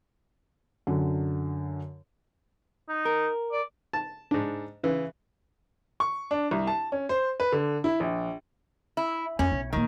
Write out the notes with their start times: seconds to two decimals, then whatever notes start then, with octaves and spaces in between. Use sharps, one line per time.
0.87 F#2 D3
2.89 D#4
3.05 A#4
3.52 D5
3.93 A5
4.31 G#2 D4
4.83 C#3 E3
6.00 C#6
6.31 D4
6.51 C2
6.67 A5
6.92 C#4
7.09 C5
7.40 B4
7.52 D3
7.84 E4
8.00 A#1
8.97 E4
9.39 F2 C#4
9.52 B1
9.73 A#2 D#3 A#3